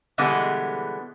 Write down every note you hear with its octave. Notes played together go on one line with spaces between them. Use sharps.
B2 D3 E3 G3 G#3 B3